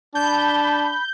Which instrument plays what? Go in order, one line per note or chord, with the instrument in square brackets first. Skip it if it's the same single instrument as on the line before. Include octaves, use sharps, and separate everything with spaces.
[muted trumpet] D4 [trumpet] A5 [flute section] B5 [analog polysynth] G6